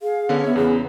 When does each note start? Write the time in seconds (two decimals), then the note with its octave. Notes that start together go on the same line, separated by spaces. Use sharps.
0.01 G#4 F5
0.29 D3 B3 C#4
0.44 B3 C#5 E5
0.56 E2 C#3 G#4